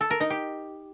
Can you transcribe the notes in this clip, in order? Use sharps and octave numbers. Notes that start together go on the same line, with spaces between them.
A4
A#4
D#4
G4